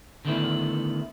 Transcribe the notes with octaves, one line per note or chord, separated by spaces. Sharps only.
D3 D#3 A3 B3 E4